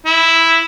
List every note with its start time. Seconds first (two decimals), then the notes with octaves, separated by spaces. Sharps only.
0.06 E4